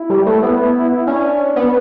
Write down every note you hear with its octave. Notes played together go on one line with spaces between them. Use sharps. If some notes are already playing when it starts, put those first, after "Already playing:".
Already playing: E4
G3
A3
B3
C#4 D4
B3